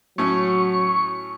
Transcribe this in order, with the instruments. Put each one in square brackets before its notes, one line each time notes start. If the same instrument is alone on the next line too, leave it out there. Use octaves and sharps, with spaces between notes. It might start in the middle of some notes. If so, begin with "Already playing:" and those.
[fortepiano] A2 C#4 [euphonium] F#3 [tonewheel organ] C#6